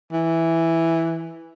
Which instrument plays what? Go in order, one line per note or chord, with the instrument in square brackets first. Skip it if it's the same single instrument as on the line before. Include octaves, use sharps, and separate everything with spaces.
[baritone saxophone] E3